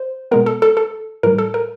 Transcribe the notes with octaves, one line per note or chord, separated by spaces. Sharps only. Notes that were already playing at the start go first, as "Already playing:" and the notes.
Already playing: C5
B2 G#3 B3 A#4
A4
A4
A4
A2 E3 G3 A#4
A4
A#4